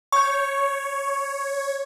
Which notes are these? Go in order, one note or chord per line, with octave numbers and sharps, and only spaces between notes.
C#5 C#6 G6